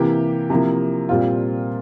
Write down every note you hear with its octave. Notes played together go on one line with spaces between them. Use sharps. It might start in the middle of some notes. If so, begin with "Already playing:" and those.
Already playing: C3 E3 A#3 E4 G4
C3 F3 A#3 E4
A#2 G3 C4 F4